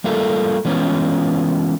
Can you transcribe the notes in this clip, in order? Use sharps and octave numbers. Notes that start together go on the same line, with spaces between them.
G3 A3 A#3 F4 G#4 A4
E3 G#3 B3 C#4 F4